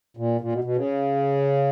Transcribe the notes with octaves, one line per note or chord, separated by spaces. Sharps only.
A#2
A#2
B2
B2
C#3